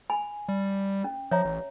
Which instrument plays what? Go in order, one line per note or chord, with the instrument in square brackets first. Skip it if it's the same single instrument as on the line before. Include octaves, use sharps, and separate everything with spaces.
[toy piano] G#5 B5
[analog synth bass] G3
[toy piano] C#4
[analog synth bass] F3 [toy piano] C#5 E5 A#5
[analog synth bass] A1